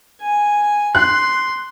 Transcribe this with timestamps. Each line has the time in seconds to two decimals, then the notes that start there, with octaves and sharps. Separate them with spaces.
0.21 G#5
0.95 C6 F#6